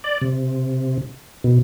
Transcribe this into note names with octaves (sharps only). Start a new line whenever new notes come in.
D5
C3
B2